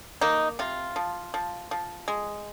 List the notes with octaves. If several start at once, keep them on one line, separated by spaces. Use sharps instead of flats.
A#3 D#4
C3 F4
F3
F3
F3
G#3